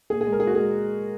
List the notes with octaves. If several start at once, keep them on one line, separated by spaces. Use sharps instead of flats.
A#2 G#4
G#4
G#3
A#4
G#4
A#2 F#4
G#3 G#4